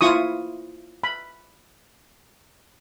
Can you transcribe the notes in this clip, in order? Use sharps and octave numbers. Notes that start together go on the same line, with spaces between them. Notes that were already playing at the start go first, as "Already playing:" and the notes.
E4 F4 C#6 D#6
B5